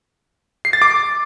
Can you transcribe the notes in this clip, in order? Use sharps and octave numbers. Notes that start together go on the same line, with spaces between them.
C7
A6
D6